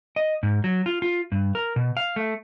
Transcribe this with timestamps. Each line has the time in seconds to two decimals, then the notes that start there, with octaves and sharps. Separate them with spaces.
0.16 D#5
0.43 G#2
0.64 F#3
0.86 F4
1.02 F4
1.32 G2
1.55 A#4
1.76 B2
1.97 F5
2.16 A3